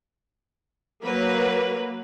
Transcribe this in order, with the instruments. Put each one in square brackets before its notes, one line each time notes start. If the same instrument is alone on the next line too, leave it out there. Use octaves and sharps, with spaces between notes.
[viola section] F#3 A#3 B4